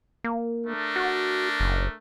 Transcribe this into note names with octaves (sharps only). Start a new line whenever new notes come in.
A#3
A3 D4 A#4
F#4
F#1